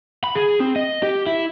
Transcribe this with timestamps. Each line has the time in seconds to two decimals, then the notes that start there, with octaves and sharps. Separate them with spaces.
0.24 B5
0.35 G#4
0.60 C4
0.76 D#5
1.03 G4
1.27 E4